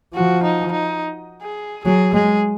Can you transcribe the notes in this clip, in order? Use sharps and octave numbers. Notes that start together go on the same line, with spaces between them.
F3 F#4
D#4
D#4
G#4
F#3 G#4
G#3 G#4